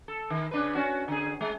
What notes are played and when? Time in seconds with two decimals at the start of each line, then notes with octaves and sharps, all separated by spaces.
0.08 A4
0.30 D#3
0.51 C#3 D4 B4
0.75 C#4 F#4
1.08 D3 G#4
1.41 G#3